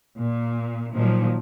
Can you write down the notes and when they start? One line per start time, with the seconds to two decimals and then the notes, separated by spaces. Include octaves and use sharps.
0.18 A#2
0.92 A#2 D#3 F3 F#3